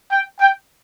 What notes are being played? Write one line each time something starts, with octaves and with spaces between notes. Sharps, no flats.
G5
G5